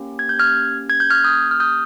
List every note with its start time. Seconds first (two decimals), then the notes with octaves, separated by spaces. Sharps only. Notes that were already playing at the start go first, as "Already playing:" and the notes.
Already playing: A#3 C#4 G4
0.19 G#6
0.29 G6
0.39 F6 G#6
0.90 G#6
1.00 G6
1.10 F6 G#6
1.24 D#6 G6
1.51 F6
1.60 D#6 G6